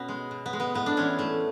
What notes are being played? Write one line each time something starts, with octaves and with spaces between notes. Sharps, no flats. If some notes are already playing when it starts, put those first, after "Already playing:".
Already playing: B2 B3 C#4
G#3
B2
B3
G#3
B3
A2 B3
D4
E3 G#3 C#4
A2 A3